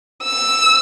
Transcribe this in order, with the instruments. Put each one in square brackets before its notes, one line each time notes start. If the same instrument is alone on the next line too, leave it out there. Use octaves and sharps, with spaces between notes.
[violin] E6